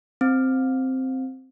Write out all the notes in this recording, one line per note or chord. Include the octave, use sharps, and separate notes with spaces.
C4